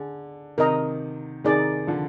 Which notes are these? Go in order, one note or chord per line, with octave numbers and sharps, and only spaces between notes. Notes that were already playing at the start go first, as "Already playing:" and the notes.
Already playing: D3 G#4 D5
C3 D#3 A#4 D#5 A#5
C3 D#3 D#4 G#4 D5
D3 F3